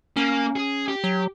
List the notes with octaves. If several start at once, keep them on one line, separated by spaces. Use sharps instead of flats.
A#3 C#4
G#4
G4
F#3